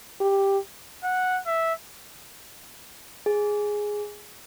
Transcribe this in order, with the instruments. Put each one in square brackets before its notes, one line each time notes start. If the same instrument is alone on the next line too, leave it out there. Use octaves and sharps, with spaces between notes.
[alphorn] G4
[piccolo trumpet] F#5
E5
[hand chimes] G#4